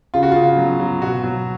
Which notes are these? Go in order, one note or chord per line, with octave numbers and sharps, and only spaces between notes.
C#3 F4
F#4
C#3 F4
F#3
F#3
B2 F#4
F#3